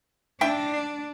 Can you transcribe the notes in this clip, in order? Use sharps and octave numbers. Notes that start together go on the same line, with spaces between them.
D4 E5 G5